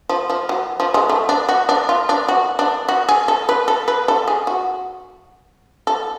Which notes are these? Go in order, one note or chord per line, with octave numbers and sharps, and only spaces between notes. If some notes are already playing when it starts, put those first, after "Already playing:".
F3
F3
F#3
F3
G#3
A3
D4
F#4
D4
F4
D4
F#4
D4
F#4
G#4
A4
B4
A4
B4
A4
G#4
F#4
A4